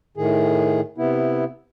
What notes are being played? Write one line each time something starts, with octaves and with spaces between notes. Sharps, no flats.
A2 D#3 G#4
C3 B3 E4